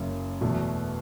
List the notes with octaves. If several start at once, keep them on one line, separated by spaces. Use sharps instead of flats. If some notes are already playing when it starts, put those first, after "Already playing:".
Already playing: F#1 F#2 C#3
E2 B2 F#3 A3